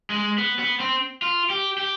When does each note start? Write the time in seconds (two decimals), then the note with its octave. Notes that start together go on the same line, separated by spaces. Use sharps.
0.10 G#3
0.38 B3
0.59 B3
0.80 C4
1.22 F4
1.50 G4
1.78 G4